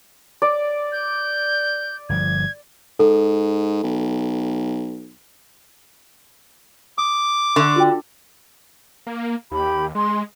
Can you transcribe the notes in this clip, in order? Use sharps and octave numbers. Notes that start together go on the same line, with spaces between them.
D5
G6
G1 A#2 F3 G#6
G#2 A4
B1
D6 D#6
D3 C#6
F4 F#4 G5
A#3
D#2 G4 B5
G#3 C6